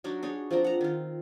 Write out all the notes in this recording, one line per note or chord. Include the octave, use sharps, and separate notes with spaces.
F#3 D4 D#4 F#4
D4 D#4 G#4 C#5
F3 C4 D4 A#5
F#5 A#5
D#3 F4